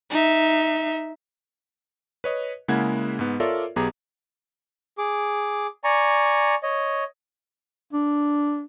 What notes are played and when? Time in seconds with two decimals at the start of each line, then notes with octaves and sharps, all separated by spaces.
0.10 D#4 E5
2.24 B4 C#5 D#5
2.68 C#3 G#3 A#3 E4 F#5 G#6
3.19 G#2 B3
3.40 F4 A4 A#4 C#5 D5 E5
3.76 B1 B3 G4 G#4 A#5
4.98 G#4 D6
5.84 D5 G#5 A#5 C#6
6.63 C#5 D#5
7.93 D4